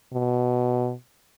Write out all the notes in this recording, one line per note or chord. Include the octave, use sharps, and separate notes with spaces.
B2